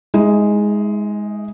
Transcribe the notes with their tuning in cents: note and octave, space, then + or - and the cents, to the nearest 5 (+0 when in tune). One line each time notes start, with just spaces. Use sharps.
G#3 +0 D#4 +35 E5 -5